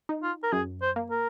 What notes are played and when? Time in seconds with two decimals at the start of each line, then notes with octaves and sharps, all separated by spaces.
0.09 D#4
0.23 F4
0.43 A#4
0.53 F#2 G#4
0.82 C5
0.96 A#3
1.11 A#4